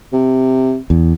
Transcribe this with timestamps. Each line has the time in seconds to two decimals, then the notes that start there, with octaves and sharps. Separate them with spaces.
0.13 C3
0.90 E2